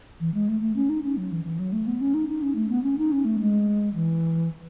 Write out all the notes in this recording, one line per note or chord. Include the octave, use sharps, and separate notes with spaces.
E3
G#3
A3
A3
C#4
D#4
C#4
F#3
E3
E3
F#3
A3
B3
C#4
D#4
D#4
C#4
A3
B3
C#4
D#4
C#4
A3
G#3
E3